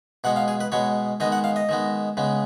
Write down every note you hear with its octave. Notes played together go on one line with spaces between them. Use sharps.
B2 G#3 B3 F#5
F5
G#4
B4
B2 G#3 B3 C#5
D#3 G#3 B3 D#5
F#5
F5
D#5
D#3 G#3 B3
C#3 G#3 B3